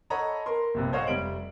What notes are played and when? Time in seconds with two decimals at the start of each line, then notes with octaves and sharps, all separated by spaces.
0.10 A4 C#5 D#5 F#5 A#5 B5
0.46 A#4 A#5 C6
0.74 A#1 G2 C3
0.93 C5 C#5 D#5 F5 F#5
1.07 F1 G3 D7 F#7